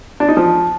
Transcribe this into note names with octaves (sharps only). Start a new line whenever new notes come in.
D4
D#4
F3